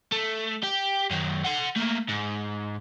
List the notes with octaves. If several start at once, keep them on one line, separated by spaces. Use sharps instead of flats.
A3
G4
F#2 D#3
F#5 C6
A3 A#3
G#2